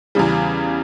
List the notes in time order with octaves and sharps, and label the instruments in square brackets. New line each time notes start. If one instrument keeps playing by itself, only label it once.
[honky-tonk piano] E2 C#3 G3